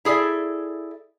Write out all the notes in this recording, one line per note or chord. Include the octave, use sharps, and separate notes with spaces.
E4 G#4 A4 D5 E5